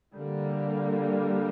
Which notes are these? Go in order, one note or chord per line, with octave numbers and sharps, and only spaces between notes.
D3 G3 A#3